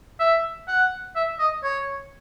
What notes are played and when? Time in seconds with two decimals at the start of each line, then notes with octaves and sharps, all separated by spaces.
0.19 E5
0.68 F#5
1.16 E5
1.39 D#5
1.63 C#5